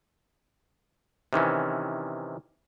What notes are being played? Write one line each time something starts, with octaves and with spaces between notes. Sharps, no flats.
C3 D#3 E3 C#4